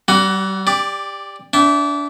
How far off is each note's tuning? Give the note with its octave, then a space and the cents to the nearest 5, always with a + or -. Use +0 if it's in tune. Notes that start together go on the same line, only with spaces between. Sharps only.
G3 -30 F#4 +20 F#5 +10
G4 +20 D5 +0
D4 -25 E5 +0 G5 -30